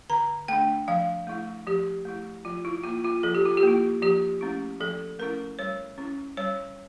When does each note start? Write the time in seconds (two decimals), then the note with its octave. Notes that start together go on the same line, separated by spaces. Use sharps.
0.10 D3 A#5
0.48 A3 D4 G5
0.88 F3 F5
1.27 A3 E4
1.67 F3 G4
2.05 A3 E4
2.45 F3 F4
2.65 E4
2.84 A#3 E4 F4
3.04 F4
3.23 F3 A4
3.35 G4
3.46 F4
3.57 G4
3.63 A#3 E4
4.02 F3 G4
4.41 A3 C#4 E4
4.80 F3 A4
5.19 A3 C#4 E4 A#4
5.59 G3 C#5
5.98 C#4 E4
6.37 G3 C#5